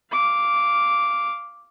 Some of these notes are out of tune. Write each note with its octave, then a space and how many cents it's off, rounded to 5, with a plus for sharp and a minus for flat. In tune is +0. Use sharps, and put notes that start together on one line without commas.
F5 -10 D6 -5